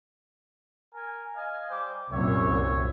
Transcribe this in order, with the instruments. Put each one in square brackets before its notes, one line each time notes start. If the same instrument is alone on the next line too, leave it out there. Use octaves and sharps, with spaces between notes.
[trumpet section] A#4 G#5
D#5 F5 G#5
G3 C5 D6
[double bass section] C2 F#2 A#2 [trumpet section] C#5 E5